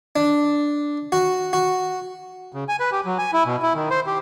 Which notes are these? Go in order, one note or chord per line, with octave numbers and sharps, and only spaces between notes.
D4
F#4
F#4
C#3
G#5
B4
G4
F#3
G#5
E4
B2
E4
D#3
C5
G4